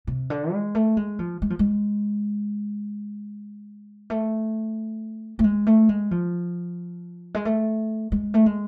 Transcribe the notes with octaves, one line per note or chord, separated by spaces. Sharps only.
C3
D3
G#3
A3
G#3
F3
G#3
F3
G#3
A3
A3
G#3
A3
G#3
F3
G#3
A3
G#3
A3
G#3